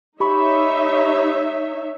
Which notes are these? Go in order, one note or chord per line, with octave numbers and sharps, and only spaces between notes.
D#4 G4 C#5 E5 B5 C#6